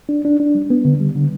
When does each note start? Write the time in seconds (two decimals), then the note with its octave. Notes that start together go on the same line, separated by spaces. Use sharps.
0.09 D4
0.25 D4
0.40 D4
0.55 G3
0.70 B3
0.85 D3
1.00 G3
1.16 D3